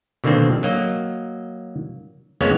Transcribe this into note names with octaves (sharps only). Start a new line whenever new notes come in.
B2 D3 D#3 A#3 C4
F#3 A#3 D#5
F2 G#3 A#3 B3 C#4 C#5